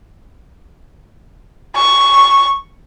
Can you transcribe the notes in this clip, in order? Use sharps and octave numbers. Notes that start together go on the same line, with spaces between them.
C#6